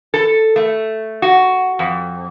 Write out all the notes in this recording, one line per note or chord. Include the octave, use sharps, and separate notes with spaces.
A4
A3
F#4
F2